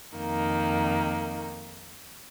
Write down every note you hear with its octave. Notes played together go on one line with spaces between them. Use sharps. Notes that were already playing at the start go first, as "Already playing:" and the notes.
F2 D#3 A#3 D#4